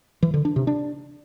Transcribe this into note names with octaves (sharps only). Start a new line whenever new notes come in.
E3
D3
D4
C3
D4